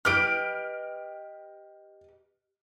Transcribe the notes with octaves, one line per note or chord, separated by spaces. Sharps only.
G4 B4 D#5 F6 D7